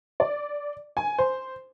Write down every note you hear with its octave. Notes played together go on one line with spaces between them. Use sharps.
D5
G#5
C5